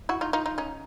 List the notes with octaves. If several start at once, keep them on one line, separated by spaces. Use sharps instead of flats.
E4 F#4
D#4 F4
D#4 F4
D#4 F4
C#4 D#4